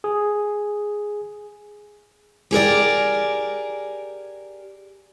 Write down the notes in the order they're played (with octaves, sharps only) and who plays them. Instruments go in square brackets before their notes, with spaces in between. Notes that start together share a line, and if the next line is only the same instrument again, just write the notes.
[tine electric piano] G#4
[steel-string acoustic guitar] G4 G#4 A#4 D5